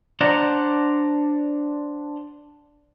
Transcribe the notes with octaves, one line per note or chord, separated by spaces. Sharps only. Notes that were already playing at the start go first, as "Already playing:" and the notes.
D4 C5 D5 F#5 A#5